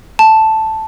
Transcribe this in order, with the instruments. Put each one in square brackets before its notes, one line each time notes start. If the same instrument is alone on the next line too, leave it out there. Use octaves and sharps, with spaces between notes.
[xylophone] A5